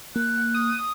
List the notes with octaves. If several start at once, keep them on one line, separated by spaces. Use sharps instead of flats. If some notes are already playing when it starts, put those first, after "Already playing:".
A#3 F#6
D#6